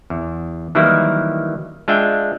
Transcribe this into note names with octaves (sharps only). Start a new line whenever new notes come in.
E2
D#3 E3 F#3 G3 A#3 E4
G#3 D4 F4 E5 G5